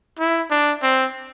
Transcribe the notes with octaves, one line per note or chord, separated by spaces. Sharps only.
E4
D4
C4